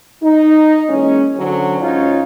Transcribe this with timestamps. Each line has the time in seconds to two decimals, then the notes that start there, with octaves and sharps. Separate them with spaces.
0.23 D#4
0.90 E3 G#3 A#3 C#4
1.37 D3 F#3 C#4 C5 C#5
1.81 G#2 C#4 D#4 F4 C#5